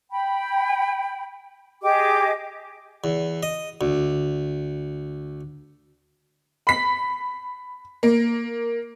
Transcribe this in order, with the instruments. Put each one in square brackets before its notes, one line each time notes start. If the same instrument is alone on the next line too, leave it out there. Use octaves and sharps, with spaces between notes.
[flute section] G5 B5
G4 G#4 D#5 D6
[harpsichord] E2
D#5
D2
[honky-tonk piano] B5 B6
A#3